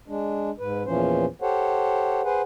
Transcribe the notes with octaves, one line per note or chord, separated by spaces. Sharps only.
G#3 D4
G#2 B4
E2 A#2 E3 F3 C#4 C5
G4 A4 C5 C#5 F#5
G#4 B4 C5 F#5